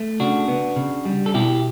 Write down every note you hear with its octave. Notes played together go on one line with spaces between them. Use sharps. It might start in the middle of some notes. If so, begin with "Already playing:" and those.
Already playing: A3
C#3 D4 F#4
B3
C#3
G3
A4
B2 E4 G4